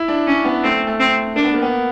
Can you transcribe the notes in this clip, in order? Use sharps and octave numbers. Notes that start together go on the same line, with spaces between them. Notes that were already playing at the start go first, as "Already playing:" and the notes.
Already playing: E4
D4
C#4
B3
A3 C4
A3
C4
A#3 D4
B3
A#3
B3